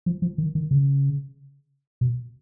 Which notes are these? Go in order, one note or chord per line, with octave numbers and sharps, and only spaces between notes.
F3
F3
D#3
D#3
C#3
B2